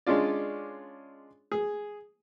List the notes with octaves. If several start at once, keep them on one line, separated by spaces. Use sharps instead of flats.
G#3 C#4 D4 F4 D5
G#4